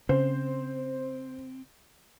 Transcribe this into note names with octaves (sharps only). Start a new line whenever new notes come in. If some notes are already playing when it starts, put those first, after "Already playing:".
C#3 C4 C5